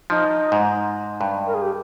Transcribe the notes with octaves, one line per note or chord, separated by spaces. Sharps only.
F3 D#4
G#2
G2
A#4
G#4
G4